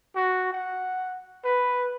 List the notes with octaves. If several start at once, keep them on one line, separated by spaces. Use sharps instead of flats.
F#4
F#5
B4